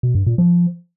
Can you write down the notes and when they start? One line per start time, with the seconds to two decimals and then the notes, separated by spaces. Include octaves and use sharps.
0.03 B2
0.15 G2
0.27 A#2
0.38 F3